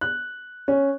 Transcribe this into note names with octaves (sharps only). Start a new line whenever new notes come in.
F#6
C#4